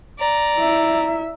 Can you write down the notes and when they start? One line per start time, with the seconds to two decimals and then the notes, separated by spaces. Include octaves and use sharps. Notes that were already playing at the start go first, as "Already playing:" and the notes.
0.19 D5 A#5
0.57 E4 E5